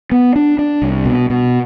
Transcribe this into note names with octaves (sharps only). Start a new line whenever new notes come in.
B3
D4
D4
C2
B2
B2